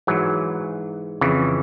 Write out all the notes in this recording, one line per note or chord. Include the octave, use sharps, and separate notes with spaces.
G#2 E3 F#3
F2 C#3 E3